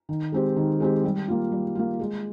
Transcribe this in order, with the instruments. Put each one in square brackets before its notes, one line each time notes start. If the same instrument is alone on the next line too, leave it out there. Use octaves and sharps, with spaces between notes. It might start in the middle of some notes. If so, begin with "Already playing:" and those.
[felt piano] D#3
G#3 C4 G4
D#3
G#3 C4 G4
G3
A#3 F4
G3
A#3 F4
G#3